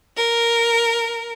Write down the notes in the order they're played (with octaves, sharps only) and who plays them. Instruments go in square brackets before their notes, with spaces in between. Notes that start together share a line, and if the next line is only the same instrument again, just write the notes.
[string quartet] A#4